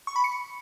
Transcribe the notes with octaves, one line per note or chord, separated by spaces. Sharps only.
C#6
B5
C#7